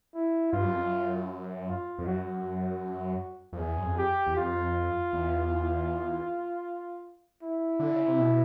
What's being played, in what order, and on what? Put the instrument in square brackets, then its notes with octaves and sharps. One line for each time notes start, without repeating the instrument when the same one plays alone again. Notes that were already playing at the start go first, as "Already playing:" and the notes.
[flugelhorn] E4
[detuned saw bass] G2 [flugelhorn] F4
[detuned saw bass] F#2
F2
F#2
[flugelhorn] F4
[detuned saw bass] F2
[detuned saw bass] F#2 [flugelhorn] F#4
[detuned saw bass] F2
[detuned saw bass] E2 [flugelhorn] G#4
[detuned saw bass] F#2
F2
[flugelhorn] G4
[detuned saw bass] E2
[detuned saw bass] F2 [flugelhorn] F4
[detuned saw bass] E2
[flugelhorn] E4
[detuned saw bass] D3
C#3
C3
B2